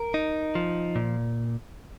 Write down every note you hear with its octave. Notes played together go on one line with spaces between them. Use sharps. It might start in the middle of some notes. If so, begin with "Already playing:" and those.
Already playing: A#4
D#4
F3
A#2